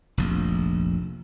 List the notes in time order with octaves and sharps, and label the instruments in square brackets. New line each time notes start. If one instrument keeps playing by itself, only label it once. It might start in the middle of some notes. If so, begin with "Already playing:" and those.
[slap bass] F1 A#1